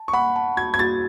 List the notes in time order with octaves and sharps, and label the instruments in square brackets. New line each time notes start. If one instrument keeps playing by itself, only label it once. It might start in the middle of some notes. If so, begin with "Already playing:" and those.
Already playing: [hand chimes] A5
[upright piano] C#6
[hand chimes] F#5 [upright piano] B5
[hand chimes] A5
[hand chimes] F#4 [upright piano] G#6
[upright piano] G#6
[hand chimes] F#4 [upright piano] A6